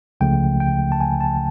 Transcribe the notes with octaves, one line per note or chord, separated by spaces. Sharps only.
C#2 C#3 F3 A3 G5
G5
A5
G#5
A5